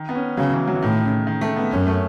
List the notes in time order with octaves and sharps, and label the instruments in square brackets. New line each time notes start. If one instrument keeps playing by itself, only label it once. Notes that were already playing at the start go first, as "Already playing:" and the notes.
Already playing: [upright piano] D#3
B3
C#4
[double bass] C#3 [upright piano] F#3
[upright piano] E3
F#3
E3
[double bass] A2 [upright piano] D#3
[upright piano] C#3
D#3
A3
B3
[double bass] F#2 [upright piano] C#4
[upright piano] A3